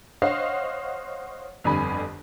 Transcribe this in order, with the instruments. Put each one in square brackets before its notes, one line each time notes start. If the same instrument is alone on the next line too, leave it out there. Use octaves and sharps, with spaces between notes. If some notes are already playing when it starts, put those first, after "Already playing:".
[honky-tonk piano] C5 C#5 D#5 F5 F#5
G1 F2 D3 G3 G#5 B5